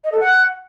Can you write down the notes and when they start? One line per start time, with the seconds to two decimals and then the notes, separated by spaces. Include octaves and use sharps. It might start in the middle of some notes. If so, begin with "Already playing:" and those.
0.04 D#5
0.12 A4
0.20 F#5